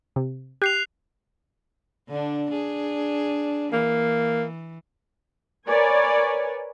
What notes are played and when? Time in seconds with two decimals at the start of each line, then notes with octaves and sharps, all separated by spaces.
0.16 C3
0.62 G4 F#6 C7 F7
2.09 D3 D4
2.51 D4 G#4
3.72 E3 A#3
5.65 A#4 B4 C#5 D5 G#5